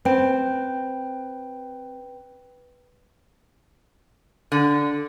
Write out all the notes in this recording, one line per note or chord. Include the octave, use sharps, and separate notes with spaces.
C4 B4 G5
D3